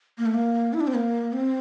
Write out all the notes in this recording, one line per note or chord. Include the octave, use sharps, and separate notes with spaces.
A#3
A3
A#3
E4
D4
C4
A#3
C4